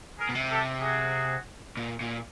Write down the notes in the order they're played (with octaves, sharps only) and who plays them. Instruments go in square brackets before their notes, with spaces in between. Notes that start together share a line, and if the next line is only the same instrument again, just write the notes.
[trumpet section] G#4 A#4
[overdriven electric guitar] B2
C3
[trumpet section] G4 A4
F#4 G#4
[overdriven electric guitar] A#2
A#2